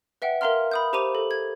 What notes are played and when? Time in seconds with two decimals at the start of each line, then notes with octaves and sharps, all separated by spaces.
0.22 B4 E5 F#5 G5
0.41 A#4 E5 F5 A#5 C6 F6
0.71 B5 D#6 G6
0.93 G4 C5 A#5 D6 D#7 F7
1.15 A4
1.31 G#6